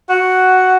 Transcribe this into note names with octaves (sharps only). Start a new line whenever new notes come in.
F#4